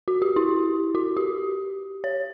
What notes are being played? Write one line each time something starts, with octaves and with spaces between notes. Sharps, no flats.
F#4
G4
E4
F#4
G4
C#5